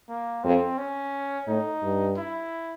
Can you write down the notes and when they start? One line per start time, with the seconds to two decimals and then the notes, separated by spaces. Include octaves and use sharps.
0.09 A#3
0.44 F2 C4
0.78 C#4
1.48 A2 D#4
1.83 G2
2.17 E4